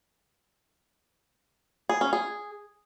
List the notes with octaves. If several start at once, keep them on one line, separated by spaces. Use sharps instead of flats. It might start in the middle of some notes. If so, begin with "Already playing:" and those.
G#4
C#4
G#4